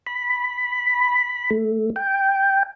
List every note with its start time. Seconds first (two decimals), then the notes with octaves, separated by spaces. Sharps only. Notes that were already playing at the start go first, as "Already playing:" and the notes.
0.07 B5
1.50 A3
1.96 G5